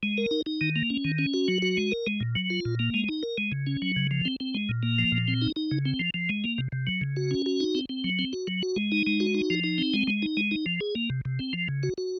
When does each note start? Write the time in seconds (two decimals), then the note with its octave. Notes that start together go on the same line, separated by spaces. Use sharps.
0.03 G#3
0.18 A#4
0.31 D#4
0.46 D#4
0.61 D#3
0.76 A#3
0.90 C#4
1.05 D#3
1.19 C#4
1.34 F#4
1.48 F#3
1.62 F#4
1.77 G#3
1.92 A#4
2.07 G#3
2.21 A#2
2.35 F#3
2.50 F4
2.65 A#2
2.79 A#3
2.94 G#3
3.09 D#4
3.23 A#4
3.38 G#3
3.52 C#3
3.67 C#4
3.82 F#3
3.96 C#3
4.11 F3
4.25 C4
4.40 C4
4.55 G#3
4.69 A#2
4.83 A#3
4.99 F3
5.12 A#2
5.28 C4
5.42 D#4
5.56 D#4
5.71 C#3
5.85 C4
6.00 F3
6.14 F3
6.29 G#3
6.44 A#3
6.58 C3
6.72 C3
6.87 F#3
7.01 C#3
7.17 F#4
7.31 C#4
7.46 F#4
7.60 D#4
7.75 C4
7.89 C4
8.04 F#3
8.19 C4
8.33 F#4
8.47 F#3
8.63 F#4
8.76 G#3
8.92 D#4
9.07 G#3
9.20 F#4
9.35 D#4
9.50 F3
9.64 D#4
9.78 C4
9.94 G#3
10.07 G#3
10.22 D#4
10.37 G#3
10.51 D#4
10.66 F3
10.81 G#4
10.95 A#3
11.10 C3
11.25 C3
11.39 C4
11.53 F3
11.68 C#3
11.83 F#4
11.98 F#4